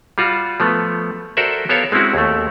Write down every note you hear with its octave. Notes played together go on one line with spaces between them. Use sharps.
G3 F4 F#4
F3 A3 B3
F#4 A4 A#4 C5 D5 E5
B3 G4 A4 A#4 C#5 F5
G#3 C4 C#4 E4 F#4
D#2 A3